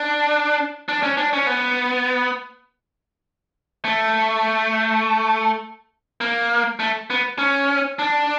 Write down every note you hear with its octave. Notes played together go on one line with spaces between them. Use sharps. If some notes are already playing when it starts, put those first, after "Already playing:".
Already playing: D4
D4
C#4
D4
C#4
B3
A3
A#3
A3
B3
C#4
D4